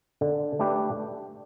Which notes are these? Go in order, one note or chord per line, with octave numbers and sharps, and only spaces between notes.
D3
A3 D4 G4 B4